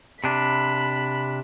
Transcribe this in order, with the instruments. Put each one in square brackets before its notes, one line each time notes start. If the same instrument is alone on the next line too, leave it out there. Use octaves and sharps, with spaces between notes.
[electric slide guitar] C3 D4 [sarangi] B5